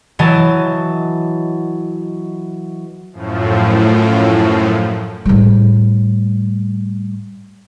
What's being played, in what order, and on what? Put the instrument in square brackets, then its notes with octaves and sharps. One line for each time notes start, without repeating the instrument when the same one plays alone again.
[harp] E3 F#3 D#5 A5
[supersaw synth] F#2 A2 F3
[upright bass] A2 G3